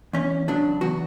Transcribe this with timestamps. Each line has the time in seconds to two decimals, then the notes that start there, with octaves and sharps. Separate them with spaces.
0.13 E2 C#4
0.48 C#3 F#3 D4
0.81 E2 F#4